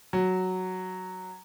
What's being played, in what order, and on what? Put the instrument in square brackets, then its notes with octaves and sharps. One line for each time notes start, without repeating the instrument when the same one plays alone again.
[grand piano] F#3